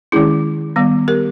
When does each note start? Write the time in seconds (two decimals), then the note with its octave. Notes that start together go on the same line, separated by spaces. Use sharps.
0.12 D#3 G#3 C#4 E4 G#4
0.76 D#3 G3 B3
1.08 G4 A#4